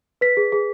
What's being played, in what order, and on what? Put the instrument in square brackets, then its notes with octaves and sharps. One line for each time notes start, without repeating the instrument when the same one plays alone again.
[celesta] B4 B6
G#4
G#4